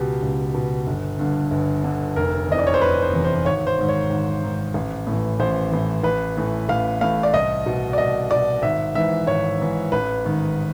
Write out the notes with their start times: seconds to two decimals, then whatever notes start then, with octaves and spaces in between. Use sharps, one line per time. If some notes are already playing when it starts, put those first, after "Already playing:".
Already playing: C#2 B2 G4
0.23 C#2
0.54 B2
0.87 G1
1.19 G2 D3
1.51 G1
1.84 G2 D3
2.16 F1 A#4
2.48 E2 C3 E3 D#5
2.59 D5
2.67 C#5
2.74 C5
2.81 F1 B4
3.02 C5
3.13 E2 C3 E3
3.24 C5
3.45 G#1 C#5
3.67 C5
3.78 G#2 D#3
3.89 C#5
4.10 G#1
4.42 G#2 D#3
4.74 A1
5.07 A2 E3
5.40 A1 C5
5.71 A2 E3
6.04 A1 B4
6.37 A2 E3
6.69 A1 F5
7.01 A2 E3 F5
7.23 D5
7.33 C2 D#5
7.66 B2
7.93 D5
7.98 C2 D#5
8.31 B2 D5
8.62 G#1 E5
8.95 G#2 E3 E5
9.27 G#1 C#5
9.59 G#2 E3
9.92 A1 B4
10.25 G#2 D#3